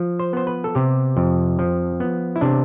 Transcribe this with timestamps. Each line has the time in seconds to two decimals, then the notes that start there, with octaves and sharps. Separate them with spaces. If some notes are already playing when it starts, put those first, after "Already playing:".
Already playing: F3
0.20 C5
0.33 B3 C5
0.47 B4
0.64 A4
0.75 C3 G4
1.17 F2
1.59 F3
2.00 B3
2.36 E4
2.41 C3 D4